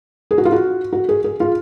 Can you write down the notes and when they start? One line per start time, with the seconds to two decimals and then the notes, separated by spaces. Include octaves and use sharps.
0.31 G#4
0.38 F#4
0.45 F4
0.52 F#4
0.93 F#4
1.09 G#4
1.24 G#4
1.40 F4